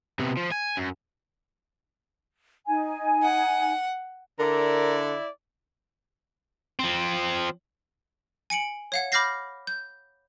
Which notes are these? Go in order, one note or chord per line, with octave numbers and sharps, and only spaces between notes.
C3 B3
F3
G#5
F#2
D#4 G#5
F#5
D3 E4 A#4 D5
F3 C4
G#5 C#7 D7 F#7
C#5 F5 F#5
B5 D6 F6 G6 A#6 C7
G6